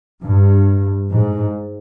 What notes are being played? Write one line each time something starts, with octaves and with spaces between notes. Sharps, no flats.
G2
G#2